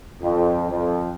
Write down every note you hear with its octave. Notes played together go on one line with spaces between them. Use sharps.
F2
F2